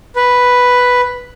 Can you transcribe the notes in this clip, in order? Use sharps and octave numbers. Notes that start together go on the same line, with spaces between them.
B4